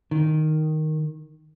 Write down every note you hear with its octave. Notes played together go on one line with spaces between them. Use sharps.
D#3